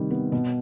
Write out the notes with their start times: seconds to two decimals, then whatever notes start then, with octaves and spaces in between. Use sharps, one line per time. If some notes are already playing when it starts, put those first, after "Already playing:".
Already playing: C3 D#3 G3
0.10 B3
0.32 B2